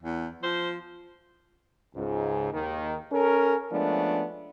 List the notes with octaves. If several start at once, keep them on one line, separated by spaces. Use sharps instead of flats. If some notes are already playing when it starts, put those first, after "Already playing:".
E2
F3 C5
C#2 G#2
D#2 D#3
C#4 A4 A#4
F3 G#3 A3 B3 C#4 D4